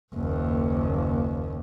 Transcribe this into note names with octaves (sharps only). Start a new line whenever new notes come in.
F#1 D#2